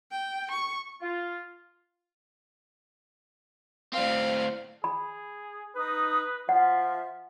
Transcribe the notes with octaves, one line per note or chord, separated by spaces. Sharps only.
G5
C#6
F4
A2 C4 D5 F5
G#4 B5
D#4 B4 D#6
F3 F4 E5 F#5